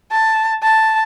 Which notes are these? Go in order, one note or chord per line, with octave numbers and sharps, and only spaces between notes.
A5
A5